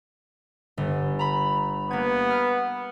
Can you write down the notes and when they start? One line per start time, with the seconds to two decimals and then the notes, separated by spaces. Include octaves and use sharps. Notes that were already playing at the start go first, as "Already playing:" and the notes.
0.77 G1
1.19 A#5 B5
1.91 A#3 B3 G#6
2.30 F6